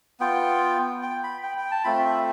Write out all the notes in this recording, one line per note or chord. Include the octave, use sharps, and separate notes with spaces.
B3 F4 G5
G5
B5
G5
G5
A5
A3 C4 F4 B5
E5